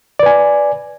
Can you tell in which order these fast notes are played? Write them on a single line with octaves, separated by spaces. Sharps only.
D5 B4 G#5